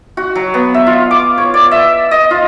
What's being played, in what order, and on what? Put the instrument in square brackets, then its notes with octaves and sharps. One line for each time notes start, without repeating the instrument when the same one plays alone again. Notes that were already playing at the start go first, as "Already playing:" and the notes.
[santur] F#4
F#3
B3
E5
F4
D6
C#5
D5
E5
D#5
F4